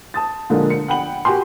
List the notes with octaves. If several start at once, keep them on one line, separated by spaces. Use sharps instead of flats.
A5 D#6 A6
A#2 D3 F3 G#3 A#3 A4
C#7
D4 F#5 G5 B5 F#7
F#4 G4 G#5 C6